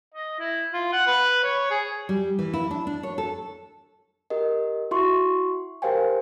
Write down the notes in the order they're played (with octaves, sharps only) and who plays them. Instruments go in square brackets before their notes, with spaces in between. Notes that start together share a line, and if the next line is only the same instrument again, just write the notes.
[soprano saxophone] D#5
E4
F4
F#5
B4
C#5
G#4
[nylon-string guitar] G3
E3
E4
D4
D4
C#5
A4
[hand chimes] G4 A#4 D#5
E4 F#4 E5 C6 C#6
G4 A#4 C5 F5 G5 G#5